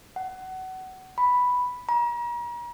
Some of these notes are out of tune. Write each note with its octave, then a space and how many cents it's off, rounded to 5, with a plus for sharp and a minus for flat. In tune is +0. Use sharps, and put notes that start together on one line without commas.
F#5 +25
B5 +0
A#5 +40